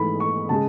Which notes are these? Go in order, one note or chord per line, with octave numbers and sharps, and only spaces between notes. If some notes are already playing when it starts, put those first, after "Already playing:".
Already playing: G#2 E3 A3 B5
C#6
C#3 G#3 A5